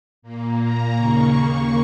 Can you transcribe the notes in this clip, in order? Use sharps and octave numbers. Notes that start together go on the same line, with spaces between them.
A#2 A#3
A#5
D#2 C#3 A#3 C#6
C#6